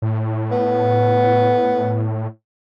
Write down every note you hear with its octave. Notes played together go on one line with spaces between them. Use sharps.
A2
B3